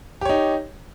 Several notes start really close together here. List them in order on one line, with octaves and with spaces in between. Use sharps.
G4 C#5 D#4